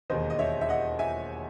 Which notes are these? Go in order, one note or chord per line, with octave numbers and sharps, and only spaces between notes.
E1 D#2 D#3 C5 D#5
D#5
C#5 E5
E5
D#5 F#5
E5 G#5